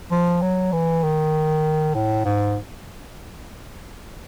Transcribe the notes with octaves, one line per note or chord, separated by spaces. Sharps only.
F3
F#3
E3
D#3
A2
G#2